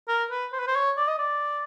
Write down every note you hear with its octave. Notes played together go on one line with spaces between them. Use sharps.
A#4
B4
C5
B4
C5
C#5
D5
D#5
D5